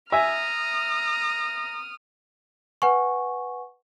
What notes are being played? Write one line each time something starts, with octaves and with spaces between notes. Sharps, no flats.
E5 G#5 A#5 D#6 F6
B4 F#5 G#5 C#6